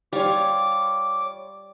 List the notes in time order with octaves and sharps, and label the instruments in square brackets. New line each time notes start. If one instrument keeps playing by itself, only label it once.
[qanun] G3 [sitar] F4 C#5 [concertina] D6